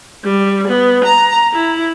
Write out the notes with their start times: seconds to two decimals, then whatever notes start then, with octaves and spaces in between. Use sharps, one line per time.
0.25 G3
0.68 B3
1.05 A#5
1.54 E4